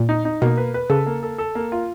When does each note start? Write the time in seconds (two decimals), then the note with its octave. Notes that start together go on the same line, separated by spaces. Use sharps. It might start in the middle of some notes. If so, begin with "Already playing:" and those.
Already playing: A#2
0.09 D#4
0.25 D#4
0.42 B2 A#3
0.57 B4
0.74 B4
0.90 C#3 A4
1.06 A#3
1.23 A4
1.38 A4
1.55 A#3
1.72 F4